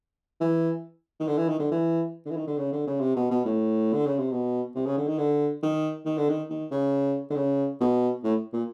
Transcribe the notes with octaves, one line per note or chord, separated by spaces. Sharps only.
E3
D#3
D3
E3
D#3
D3
E3
D3
E3
D#3
D3
C#3
D3
C#3
C3
B2
B2
A2
D3
C#3
C3
B2
C3
C#3
D3
D#3
D3
D#3
D#3
D3
D#3
D#3
C#3
D3
C#3
B2
A2
A#2